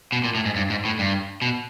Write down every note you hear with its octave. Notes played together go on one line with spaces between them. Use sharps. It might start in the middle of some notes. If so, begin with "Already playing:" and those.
B2
A#2
A2
G#2
G2
G#2
A2
G2
B2